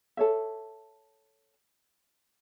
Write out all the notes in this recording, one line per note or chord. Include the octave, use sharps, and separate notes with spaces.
A4 C#5 E5